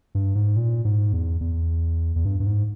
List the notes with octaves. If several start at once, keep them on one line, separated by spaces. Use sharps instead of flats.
G2
G#2
A#2
G#2
E2
E2
E2
G2
G2
G#2